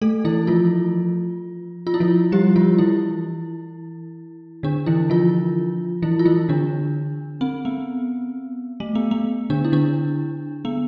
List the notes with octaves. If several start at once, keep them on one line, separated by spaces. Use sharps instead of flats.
A3 A4
E3 E4
F3 F4
F4
E4
F3 F4
G3 G4
F3 F4
E3 E4
D3 D4
E3 E4
F3 F4
E3 E4
F4
E3 E4
D3 D4
C4
B3
A3
B3
B3
D3 D4
E4
D3 D4
B3